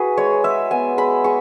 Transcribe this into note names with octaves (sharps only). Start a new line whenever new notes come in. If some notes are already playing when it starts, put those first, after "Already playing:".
Already playing: E4 F#4 G#4 B4
G#3 C#5
G#3 E5
B3 G#5
G#3 B5
G#3 C#6